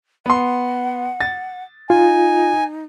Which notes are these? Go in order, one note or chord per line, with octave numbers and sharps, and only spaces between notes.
B3 F#5 C6
A6
D#4 F4 G#5